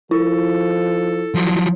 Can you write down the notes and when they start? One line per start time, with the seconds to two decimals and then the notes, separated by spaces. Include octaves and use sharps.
0.11 F3 E4 A4
1.34 F3 F#3